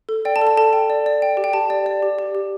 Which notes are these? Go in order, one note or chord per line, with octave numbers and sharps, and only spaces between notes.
A4
D5 G5
A5
A4
A5
A4 A5
G5
D5
D5
G5
G4
G5
G4 A5
D5
D5
G4
G4
G4